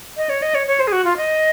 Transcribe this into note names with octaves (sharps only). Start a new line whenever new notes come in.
D#5
C#5
D#5
C#5
C#5
C5
G#4
F#4
F4
D#5